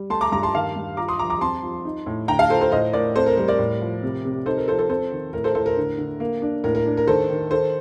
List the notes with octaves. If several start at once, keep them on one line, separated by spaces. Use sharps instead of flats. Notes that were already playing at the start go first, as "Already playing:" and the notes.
Already playing: G3
A3 A5 C6
A#5 D6
G2 A#5 D6
A5 C6
D#3 F5 A5
G2
F4 A#5 D6
C6 D#6
F3 A#5 D6
A#5 D6
C4 A5 C6
F3
D#4
A2
D3 G5 A#5
F5 A5
F4 A4 C5
A4 C5
A2 C5 D#5
A2 A#4 D5
C4 A4 C5
A#4
G3 A#4
A#4 D5
A2
F3
C3
C3
D#4 A4 C5
A#4
F3 A4 C5
A4 C5
C4 A4 C5
D#3
A2 A#4
A4 C5
A2 A4 C5
A#4
D3
D3
A#3
D4
A2 A#4
A#4
D4
A#4
D#3 A4 C5
D#3
D#3 A4 C5